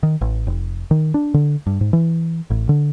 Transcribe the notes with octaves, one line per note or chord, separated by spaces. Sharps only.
D#3
A1
F1
D#3
D4
D3
G2
G#2
E3
A1
D3